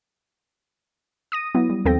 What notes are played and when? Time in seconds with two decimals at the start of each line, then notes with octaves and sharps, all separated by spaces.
1.32 D#6 A#6 D#7
1.55 F#3 B3 E4
1.69 G3
1.85 D#2 F3 C4 A4 G5 A#6